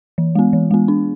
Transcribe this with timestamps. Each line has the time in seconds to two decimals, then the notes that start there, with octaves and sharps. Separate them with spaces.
0.18 E3
0.35 G#3 B3
0.53 E3
0.71 G#3 B3
0.88 D4